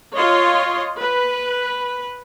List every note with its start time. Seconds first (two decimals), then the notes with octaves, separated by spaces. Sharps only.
0.16 F4 C#5 D#5 C6
1.00 B4